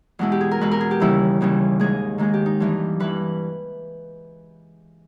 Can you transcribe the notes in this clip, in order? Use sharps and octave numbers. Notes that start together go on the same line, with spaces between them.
E2 B2 G#3 E4
G4
G#4
A#4
E2 B2 G#3 B4
A#4
G#4
G4
D#2 C#3 E3 G3 E4
D#2 C#3 E3 G3
G#2 D#3 G#3 G#4
G#2 D#3 G#3 G#4
G4
D#4
G2 E3 G3
G2 E3 G3 B4